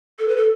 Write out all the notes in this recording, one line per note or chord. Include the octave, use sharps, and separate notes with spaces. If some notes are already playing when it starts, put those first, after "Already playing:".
A4
B4
A4